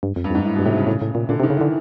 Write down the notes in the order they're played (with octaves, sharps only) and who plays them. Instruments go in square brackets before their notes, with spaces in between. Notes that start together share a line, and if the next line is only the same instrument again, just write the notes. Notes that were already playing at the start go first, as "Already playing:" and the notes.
[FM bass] G2
F2
[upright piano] G2
[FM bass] F2 [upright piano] G#2
[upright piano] A2
[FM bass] G2 [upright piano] B2
[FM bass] A2 [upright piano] C3
[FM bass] G#2 [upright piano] C#3
[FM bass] A2
A2
A#2
[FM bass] A#2 [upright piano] D3
[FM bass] C3
[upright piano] D#3
[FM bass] C#3
[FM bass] D3 [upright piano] E3